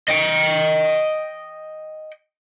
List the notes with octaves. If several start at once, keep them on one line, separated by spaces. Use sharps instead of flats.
D#5 G5